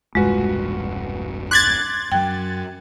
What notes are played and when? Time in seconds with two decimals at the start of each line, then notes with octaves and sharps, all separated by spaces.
0.15 E1 C2 G2 G#3 F4 F#4 B4
1.51 C6 D6 F#6 G#6 A6 B6
2.12 F#2 F#3 G5